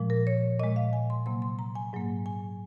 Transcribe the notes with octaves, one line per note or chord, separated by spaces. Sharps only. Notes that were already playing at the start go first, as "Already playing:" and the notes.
Already playing: A#2 F3 G#3
A#4
C#5
A#2 G#3 D#5
F5
G#5
C6
C3 F#3 A#3 C6
C6
A#5
G#5
G#2 F#3 A#3
G#5